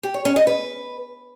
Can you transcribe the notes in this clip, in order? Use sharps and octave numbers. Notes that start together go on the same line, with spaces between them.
G4
C#5
C#4
D#5
B4